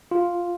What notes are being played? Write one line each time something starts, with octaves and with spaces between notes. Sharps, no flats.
F4